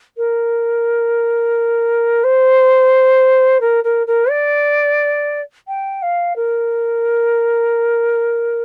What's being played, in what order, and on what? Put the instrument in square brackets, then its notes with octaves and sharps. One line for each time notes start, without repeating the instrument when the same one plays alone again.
[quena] A#4
C5
A#4
A#4
A#4
D5
G5
F5
A#4